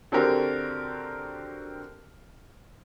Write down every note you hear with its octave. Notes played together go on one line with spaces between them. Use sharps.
D3 C4 F#4 G4 A#4